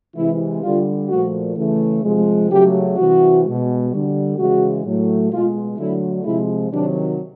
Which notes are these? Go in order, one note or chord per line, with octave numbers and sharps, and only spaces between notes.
C3 E3 G#3 E4
D3 G3 F4
A#2 F3 A3 F#4
C#3 E3 A3
C3 F3 G#3
C#3 F#3 A3 G4
C3 E3 G3 F#4
B2 G#3
D3 G3
C#3 E3 G#3 F#4
A2 F#3 A3
B2 G#3 F4
D3 F#3 A3 E4
C3 F3 G#3 E4
C3 D#3 F#3 D4